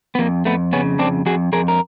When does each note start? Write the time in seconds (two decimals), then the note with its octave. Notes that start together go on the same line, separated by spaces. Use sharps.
0.15 B3
0.19 F2 A#3
0.45 F2 A3 B3
0.73 C#3 B3 C#4
0.99 F2 C4 D4
1.26 F2 F#4 G#4
1.52 F2 G#4 A#4
1.68 A#4